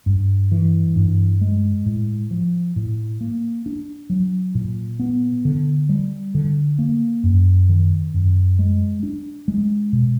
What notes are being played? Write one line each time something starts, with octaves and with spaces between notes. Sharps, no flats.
G2
E3
G2
G#3
A2
F3
A2
A#3
D4
F#3
A#2
B3
D3
G3
D3
A#3
F#2
D#3
F#2
G#3
D4
G#3
B2